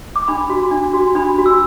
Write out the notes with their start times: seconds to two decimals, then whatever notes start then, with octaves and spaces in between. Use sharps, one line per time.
0.16 D6
0.28 D4 B5
0.50 F#4
0.71 D4
0.93 F#4
1.15 D4 B5
1.38 F#4
1.46 E6